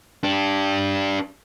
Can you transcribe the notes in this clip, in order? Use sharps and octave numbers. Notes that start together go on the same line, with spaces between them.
D4 G4